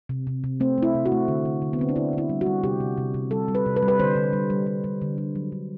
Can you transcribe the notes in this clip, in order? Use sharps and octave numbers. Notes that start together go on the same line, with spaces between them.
C3
C3
C3
A3 C4
A3 E4
C3
F#4
A3
D3
D3
D3
B3
D3 C4
D4
D3 E4
D3 E4
G3
F#4
G3
C3 G4
C3
C3
C3
G3 A4
G3
B4
C3
B4
G3
B4
D3 C5
D3
G3
G3
G3
G3
D3
G3
F#3
D3